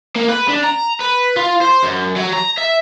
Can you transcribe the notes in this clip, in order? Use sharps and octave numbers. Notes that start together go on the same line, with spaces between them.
A#3
B4
D4
A#5
B4
F4
C5
F#2
F#3
A#5
E5